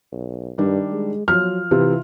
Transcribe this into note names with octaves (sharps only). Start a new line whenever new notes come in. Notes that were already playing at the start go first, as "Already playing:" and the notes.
B1
G2 D#3 G3 D4
G#3
F3 F#3 F4 F6
C3 E3 F4